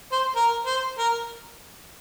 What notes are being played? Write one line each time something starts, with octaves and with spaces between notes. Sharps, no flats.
C5
A#4
C5
A#4